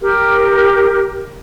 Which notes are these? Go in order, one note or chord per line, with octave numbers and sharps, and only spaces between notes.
G4 A#4